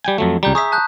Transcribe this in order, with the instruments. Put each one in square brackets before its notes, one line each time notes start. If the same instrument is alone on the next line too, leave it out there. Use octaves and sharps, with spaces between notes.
[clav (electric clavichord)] G3 G5 G#5
F2 F#3 A3
[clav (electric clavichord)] C#2 G3 [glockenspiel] A#5 G6
[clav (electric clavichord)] G#4 E5 [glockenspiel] C#6 D#6 B6
[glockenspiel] A5 F#6 G6